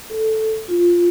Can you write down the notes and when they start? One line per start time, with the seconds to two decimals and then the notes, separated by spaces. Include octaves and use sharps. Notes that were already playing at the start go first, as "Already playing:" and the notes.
0.10 A4
0.68 F4